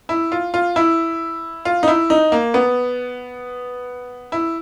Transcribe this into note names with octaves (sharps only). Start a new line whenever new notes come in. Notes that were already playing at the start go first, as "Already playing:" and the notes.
E4
F4
F4
E4
F4
D#4
E4
D#4
A#3
B3
E4